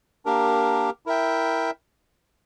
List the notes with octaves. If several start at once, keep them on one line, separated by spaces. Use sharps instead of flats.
A#3 D4 G4 A#4
E4 A#4 E5 G5